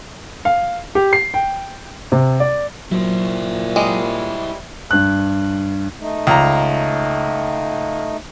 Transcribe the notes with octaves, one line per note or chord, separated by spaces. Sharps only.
F5
G4
C7
G5
C3
D5
A#2 F#3 E4 C5
G3 G#3 D#5
G2 F#6
A3 D#4
C#2 A#5